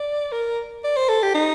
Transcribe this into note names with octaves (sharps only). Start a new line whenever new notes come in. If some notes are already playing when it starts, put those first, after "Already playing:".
Already playing: D5
A#4
D5
C5
A4
G4
D#4